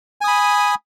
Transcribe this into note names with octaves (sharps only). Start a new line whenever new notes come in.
G#5 B5 D#6